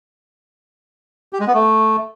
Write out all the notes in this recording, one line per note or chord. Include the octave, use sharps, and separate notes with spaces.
G4
G#3
B3
A3